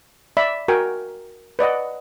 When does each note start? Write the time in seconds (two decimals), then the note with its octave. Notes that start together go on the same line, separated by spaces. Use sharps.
0.37 D5 E5 B5
0.68 F#4 A#4 G5 G#5
1.59 B4 D5 D#5 F#5